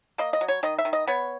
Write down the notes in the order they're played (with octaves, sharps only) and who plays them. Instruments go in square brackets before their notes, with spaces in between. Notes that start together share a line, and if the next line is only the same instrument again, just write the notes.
[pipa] A#3 D#5
D#5
F#3
C#5
D#3 D#5
E5
D#3
D#5
B3 C#5